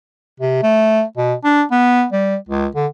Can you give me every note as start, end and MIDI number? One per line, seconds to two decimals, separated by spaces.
0.40 0.58 48
0.63 1.03 57
1.17 1.34 47
1.44 1.63 62
1.71 2.05 59
2.13 2.36 55
2.49 2.67 37
2.75 2.87 50